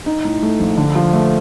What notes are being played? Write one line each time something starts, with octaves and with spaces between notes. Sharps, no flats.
D#4
A2
A3
A#1
D3
F3
A3